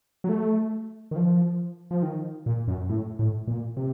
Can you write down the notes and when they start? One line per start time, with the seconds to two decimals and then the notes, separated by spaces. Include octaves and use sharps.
0.24 F#3
0.29 A3
1.11 D#3
1.16 F3
1.91 F3
2.03 D#3
2.46 A#2
2.68 F#2
2.89 A2
3.19 A2
3.47 A#2
3.77 C3